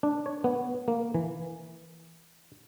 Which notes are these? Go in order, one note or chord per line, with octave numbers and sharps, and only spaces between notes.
D4
C#5
B3
A#3
E3